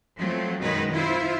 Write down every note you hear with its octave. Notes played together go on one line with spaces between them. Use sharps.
F3 F#3 A3 C4
F#2 B2 D#3 G#3 D#4 B4
E4 F4 C5 E5